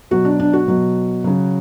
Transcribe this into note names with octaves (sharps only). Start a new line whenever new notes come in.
B2 F#3 F#4
D4
D4
F#4
B2 F#3
C#3 F#3